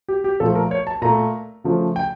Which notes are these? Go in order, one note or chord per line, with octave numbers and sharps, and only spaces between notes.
G4
G4
A#2 F3 A3 A4
A#4
C#5
A5
A#2 A3 A#5
C#3 F3 A3
G5